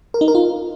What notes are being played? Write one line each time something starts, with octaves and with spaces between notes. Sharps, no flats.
A#4
D#4
A#4
F4